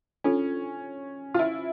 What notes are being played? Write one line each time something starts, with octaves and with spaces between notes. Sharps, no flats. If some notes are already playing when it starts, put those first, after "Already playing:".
C#4 D4 F4 A4
F4
E4